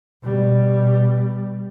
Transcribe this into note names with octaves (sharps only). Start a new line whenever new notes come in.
B2 G3